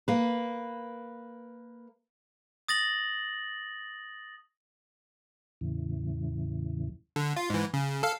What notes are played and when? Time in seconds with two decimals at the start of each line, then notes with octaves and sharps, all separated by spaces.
0.08 A#3 B4
2.68 D#6 A6 A#6 F#7
5.61 E2 A2 C#3 E3
7.16 D3
7.36 F4
7.50 G#2 E3
7.74 C#3
8.03 A4 F5